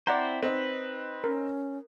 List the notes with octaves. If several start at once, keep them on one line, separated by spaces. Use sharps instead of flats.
C4 E4 C5 D5 F#5 A#5
C4 D#4 B4
C#4 A#4